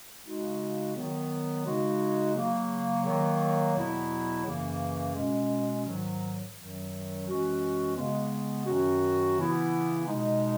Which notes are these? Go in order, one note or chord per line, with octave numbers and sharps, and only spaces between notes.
C#3 G#3 D#4 F#4
D#3 F#3 B3
C#3 G#3 D#4 F#4
C#3 F#3 A#3
D#3 F#3 A#3
E2 B2 F#3 B3 E4
F#2 C#3 E3 A#3
B2 G#3 C#4
G#2 D#3 F#3
F#2 D#3 F#3
F#2 E3 G#3 C#4 F#4
C#3 G#3 B3
F#2 D#3 F#3 C#4 F#4
C#3 E3 B3 E4
B2 G#3 D#4